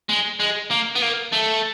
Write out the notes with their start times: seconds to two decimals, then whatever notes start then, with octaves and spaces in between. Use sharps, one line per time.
0.09 G#3
0.40 G#3
0.71 A#3
0.95 B3
1.02 A#3
1.33 A3